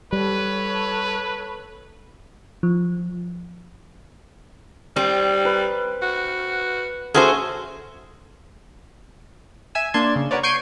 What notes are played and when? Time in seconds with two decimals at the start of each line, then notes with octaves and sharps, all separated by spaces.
0.13 G3 A4 B4 C#5
2.63 F3
4.96 G3 C4
5.45 B4
6.02 F#4
7.14 A3 C#4 F#4 G#4 C5 E5
9.75 E5 G#5 E6
9.94 A#3 D4 D5 A5 C6 G#6
10.16 C#3
10.31 F#4 A#4 B4 C#5 D5
10.43 C#6 G6 G#6 C7 D7 D#7